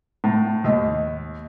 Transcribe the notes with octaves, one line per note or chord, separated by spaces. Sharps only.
A2
D#2